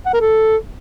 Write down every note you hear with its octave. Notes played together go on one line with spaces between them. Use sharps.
F#5
A#4
A4